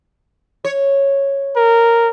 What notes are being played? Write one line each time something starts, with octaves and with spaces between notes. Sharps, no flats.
C#5
A#4